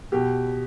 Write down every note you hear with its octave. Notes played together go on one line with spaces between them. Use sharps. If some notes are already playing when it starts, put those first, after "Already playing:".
B2 G4